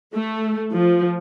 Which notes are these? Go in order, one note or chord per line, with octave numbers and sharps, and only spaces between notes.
A3
F3